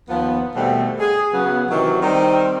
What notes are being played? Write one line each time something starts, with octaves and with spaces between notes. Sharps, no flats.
D#2 F3 B3
B2 D#3 G3 A3 C4
G#4
C#3 F#3 B3
C3 D#3 E3 F#3
D#3 G3 C4